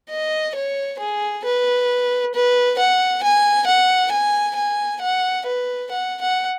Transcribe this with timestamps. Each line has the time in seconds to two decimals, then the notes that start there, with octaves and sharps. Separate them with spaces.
0.10 D#5
0.55 C#5
0.99 G#4
1.44 B4
2.34 B4
2.78 F#5
3.23 G#5
3.67 F#5
4.12 G#5
4.56 G#5
5.02 F#5
5.46 B4
5.91 F#5
6.21 F#5